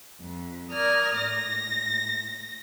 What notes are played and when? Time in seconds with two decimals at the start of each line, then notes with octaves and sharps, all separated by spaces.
0.20 F2
0.72 A#4 D5 D#6 F6 G#6
1.16 A2 A#6